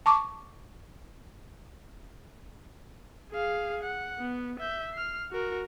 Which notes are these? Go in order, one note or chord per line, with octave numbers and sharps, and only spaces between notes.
A5 C#6 D6
G#4 F5
F#5
B3
E5 G6
F6 C7
F#4 A#4